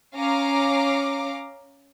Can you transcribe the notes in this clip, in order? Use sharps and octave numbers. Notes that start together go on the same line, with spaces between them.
C#4 F5 A#5 D6